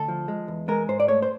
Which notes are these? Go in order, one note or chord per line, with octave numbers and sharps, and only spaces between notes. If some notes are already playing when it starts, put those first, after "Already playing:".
Already playing: D2 A4
F3
G#3
E2
G#3 A#4
G#2 C5
D5
A3 C#5
C5